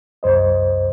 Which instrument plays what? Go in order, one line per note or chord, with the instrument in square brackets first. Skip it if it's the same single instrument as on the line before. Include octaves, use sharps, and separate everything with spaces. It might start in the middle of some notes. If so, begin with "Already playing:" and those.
[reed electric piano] C2 F#2 C5 D#5